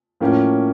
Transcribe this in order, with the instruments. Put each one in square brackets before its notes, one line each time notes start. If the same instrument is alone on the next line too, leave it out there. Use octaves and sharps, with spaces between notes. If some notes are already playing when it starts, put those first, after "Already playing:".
[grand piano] A2 F3 A#3 C#4